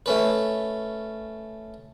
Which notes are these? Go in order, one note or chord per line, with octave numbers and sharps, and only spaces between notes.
A3 C#4 B4